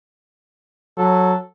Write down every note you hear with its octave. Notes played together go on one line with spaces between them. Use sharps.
F#3 A4